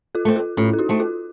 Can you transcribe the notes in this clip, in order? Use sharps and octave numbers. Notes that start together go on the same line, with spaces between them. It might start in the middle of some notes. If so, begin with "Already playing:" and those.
F4 A4
A3 C4
F4 A4
A2 C#4 F4
A4
D#4 F#4
A3 C4
F4 A4